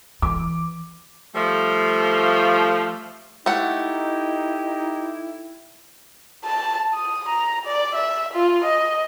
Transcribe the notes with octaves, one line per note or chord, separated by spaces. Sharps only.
E3 D6
F3 G3 A3
A3 D#4 E4 G4 F#5
A5
D#6
A#5
D5
E5
F4
D#5